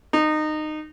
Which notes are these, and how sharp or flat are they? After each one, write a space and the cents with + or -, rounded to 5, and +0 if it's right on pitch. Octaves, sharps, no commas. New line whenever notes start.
D#4 -20